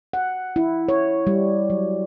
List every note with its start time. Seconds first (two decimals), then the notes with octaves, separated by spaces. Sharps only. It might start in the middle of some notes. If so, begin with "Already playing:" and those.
0.13 F#5
0.56 E4
0.89 C#5
1.27 G3
1.70 F#3